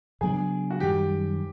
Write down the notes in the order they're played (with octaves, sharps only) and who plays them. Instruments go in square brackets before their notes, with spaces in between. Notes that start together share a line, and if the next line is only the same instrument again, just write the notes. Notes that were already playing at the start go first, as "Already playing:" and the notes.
[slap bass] C#3 F#3 B3 D4 [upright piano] G#4
[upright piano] F#4
[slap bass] F#2 D#3 G3 [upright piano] G4